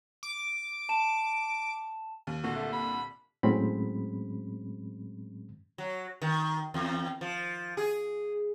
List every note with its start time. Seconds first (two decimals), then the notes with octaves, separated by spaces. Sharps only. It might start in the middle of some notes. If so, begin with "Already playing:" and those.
0.23 D6
0.89 A5 E7
2.27 D#2
2.44 C2 A#2 D3 F#4
2.56 A3
2.73 B5
3.43 A2 F#3 G#3 C4 C#4 B5
5.78 F#3
6.22 D#3
6.74 E2
7.21 F3
7.77 G#4